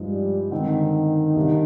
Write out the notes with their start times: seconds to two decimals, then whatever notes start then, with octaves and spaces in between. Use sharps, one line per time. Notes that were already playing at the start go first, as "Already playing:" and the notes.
Already playing: G2 F3 G#3 D#4
0.09 G3
0.51 D3 D#3 G#3 C4
1.36 C2 C3 G3 D4